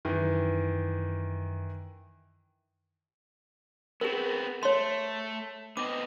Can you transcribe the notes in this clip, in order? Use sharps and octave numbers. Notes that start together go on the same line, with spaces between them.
F#2 D#3 E3
B3 C4 G#4 A#4
A3 C#5 C6
B3 C4 D#5 D6